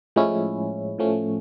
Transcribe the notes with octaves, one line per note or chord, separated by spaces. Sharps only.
A2 F3 G#3 C#4 E4
A2 F3 A3 C#4